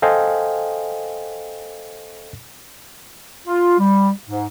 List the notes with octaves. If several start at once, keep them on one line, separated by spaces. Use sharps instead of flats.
A4 C5 D#5 F5 G5 G#5
F4
G3
G#2